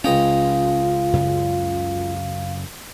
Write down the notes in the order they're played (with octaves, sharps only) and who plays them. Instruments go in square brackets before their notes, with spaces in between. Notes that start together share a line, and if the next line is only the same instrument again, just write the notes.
[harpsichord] C#2 D#5 G5 [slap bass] C#4 [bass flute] F4 [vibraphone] F5
[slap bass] F#2 C#3